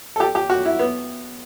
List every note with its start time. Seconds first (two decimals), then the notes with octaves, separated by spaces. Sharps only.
0.16 A4
0.20 G4
0.35 G4
0.50 F#4
0.65 E4
0.79 B3